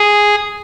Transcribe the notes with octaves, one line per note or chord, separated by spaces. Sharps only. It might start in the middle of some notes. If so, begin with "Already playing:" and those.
Already playing: G#4